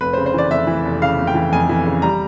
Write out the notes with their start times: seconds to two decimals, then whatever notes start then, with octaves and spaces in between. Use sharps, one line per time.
0.01 F1 B4
0.13 C5
0.17 C#3
0.26 C5
0.34 E3 D5
0.50 F1 E5
0.67 E3
0.85 F1
1.02 C#3 F5
1.18 F1
1.27 G5
1.35 E3
1.52 F2 G#5
1.69 E3
1.86 C#3
2.02 G3 A#5